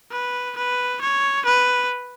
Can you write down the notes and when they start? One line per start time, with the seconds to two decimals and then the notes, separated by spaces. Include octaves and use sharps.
0.11 B4
0.57 B4
1.02 C#5
1.46 B4